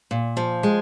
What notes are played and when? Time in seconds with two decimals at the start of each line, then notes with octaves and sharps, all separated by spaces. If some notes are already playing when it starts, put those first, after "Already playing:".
0.11 A#2
0.37 F3
0.63 G#3